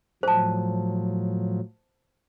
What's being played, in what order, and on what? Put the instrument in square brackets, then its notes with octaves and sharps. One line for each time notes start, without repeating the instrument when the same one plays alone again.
[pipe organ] A2 F3 F#3 [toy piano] C5 A5